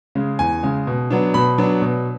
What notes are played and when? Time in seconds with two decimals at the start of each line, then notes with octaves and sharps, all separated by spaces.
0.15 C#3 G#3
0.39 E2 G#5
0.63 C#3 G#3
0.87 B2
1.10 F#3 B3 D4
1.34 B2 B5
1.58 F#3 B3 D4
1.82 B2